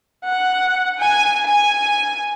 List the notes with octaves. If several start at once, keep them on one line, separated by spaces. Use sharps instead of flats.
F#5
G#5
G#5